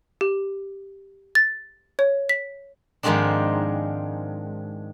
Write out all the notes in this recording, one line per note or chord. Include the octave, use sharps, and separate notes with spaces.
G4
A6
C#5
B6
G#2 D#3 F3 G#3 C4 D4